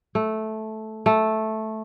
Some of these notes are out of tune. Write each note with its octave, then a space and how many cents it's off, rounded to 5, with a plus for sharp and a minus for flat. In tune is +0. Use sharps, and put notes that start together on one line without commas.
A3 -10
A3 -5